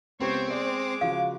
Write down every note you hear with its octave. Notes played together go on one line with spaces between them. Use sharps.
C#2 B3 C4 G4 C5 C#5
G#3 D5 D6
C#3 F3 F#4 F5